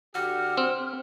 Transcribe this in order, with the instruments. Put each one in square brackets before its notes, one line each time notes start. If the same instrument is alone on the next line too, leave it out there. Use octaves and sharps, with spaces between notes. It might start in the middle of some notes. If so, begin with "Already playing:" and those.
[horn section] D3 F#4 G4 [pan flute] F6
[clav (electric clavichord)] C4